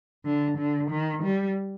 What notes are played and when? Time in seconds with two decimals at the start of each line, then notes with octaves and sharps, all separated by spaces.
0.25 D3
0.58 D3
0.90 D#3
1.23 G3